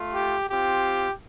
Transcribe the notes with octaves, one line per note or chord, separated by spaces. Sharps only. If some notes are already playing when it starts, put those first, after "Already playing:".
Already playing: A3 F4
G4
C4 F4 G4